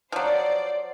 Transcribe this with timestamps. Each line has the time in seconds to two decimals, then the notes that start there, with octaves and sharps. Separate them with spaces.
0.12 F3 F#3 C5 D5